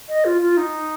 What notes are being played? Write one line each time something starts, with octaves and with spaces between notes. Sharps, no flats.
D#5
F4
F4
D#4